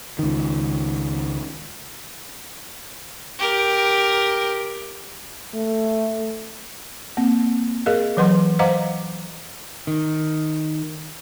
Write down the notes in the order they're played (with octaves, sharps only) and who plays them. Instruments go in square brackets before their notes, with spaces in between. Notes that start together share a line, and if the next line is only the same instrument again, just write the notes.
[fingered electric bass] C#2 D#3
[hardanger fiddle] G4 A#4
[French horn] A3
[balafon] A#3 C4
G#4 A#4 D#5 F5
E3 F#3 B4 F#5 C6
C5 D#5 F5 F#5 A#5 D6
[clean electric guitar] D#3